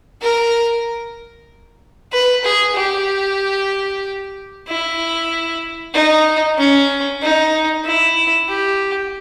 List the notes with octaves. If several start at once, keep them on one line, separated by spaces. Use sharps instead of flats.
A#4
B4
G#4
G4
E4
D#4
C#4
D#4
E4
G4